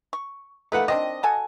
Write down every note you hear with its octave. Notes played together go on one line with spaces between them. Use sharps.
C#6
A3 A#3 D#4 B4 F#5
D#3 C4 D4 D#5
F#4 A4 G#5